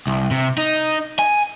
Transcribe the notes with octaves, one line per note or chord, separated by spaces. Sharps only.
C2
C3
D#4
G#5